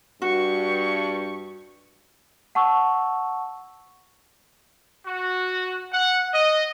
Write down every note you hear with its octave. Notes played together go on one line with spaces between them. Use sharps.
G2 F#4 C#6
F#5 A5 C#6 E6
F#4
F#5
D#5